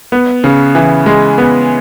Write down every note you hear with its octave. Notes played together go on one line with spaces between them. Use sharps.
B3
C#3
E3
G#3
B3